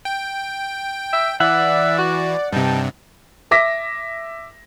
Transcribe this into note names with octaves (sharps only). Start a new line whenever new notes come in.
G5
E5
E3 D5 E5 F#5
F#4
G2 C3 D#4 G5 A5
E5 D6 A#6 B6